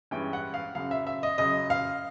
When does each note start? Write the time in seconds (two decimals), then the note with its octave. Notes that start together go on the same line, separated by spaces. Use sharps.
0.11 G2 E3 G#3 C#4 G5
0.33 F#5
0.54 F5
0.75 F#2 C#3 F#3 F5
0.91 E5
1.07 E5
1.23 D#5
1.38 F#2 C#3 F#3 D#5
1.70 F5